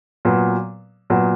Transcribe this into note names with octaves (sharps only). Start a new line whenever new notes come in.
A#2 F#3 B3
A#2 F#3 B3